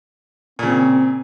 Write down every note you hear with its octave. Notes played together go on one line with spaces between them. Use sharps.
A#2 C#3 C4